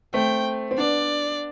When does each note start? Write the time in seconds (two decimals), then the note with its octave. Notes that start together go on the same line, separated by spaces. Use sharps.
0.14 A3 C4 G5
0.71 C4
0.78 B3 D4 D5